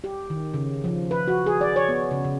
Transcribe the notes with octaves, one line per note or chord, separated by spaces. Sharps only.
G4
D#3
C#3
F3
B4
F#4
G#4
D5
C#5
B3
C#3
C#3